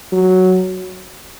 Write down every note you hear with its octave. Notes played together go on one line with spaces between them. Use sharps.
F#3